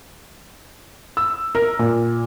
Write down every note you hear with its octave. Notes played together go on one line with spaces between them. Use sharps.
E6
A#4
A#2